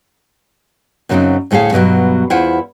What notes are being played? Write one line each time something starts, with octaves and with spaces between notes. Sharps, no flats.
F#2 C#3 F#3 A#3 C4 D#4
D2 A2 A3 G#4 F5
G2 B2 F3 F#3
E2 E4 F4 C5 F#5